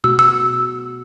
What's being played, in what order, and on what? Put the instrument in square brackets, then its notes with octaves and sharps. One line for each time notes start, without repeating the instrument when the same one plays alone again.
[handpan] B2 A3 F#4 [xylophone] E6
[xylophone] E6